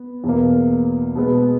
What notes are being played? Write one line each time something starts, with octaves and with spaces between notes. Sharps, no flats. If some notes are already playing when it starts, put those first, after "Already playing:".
Already playing: B3
E2 B2 A#3
B2 G#3 B3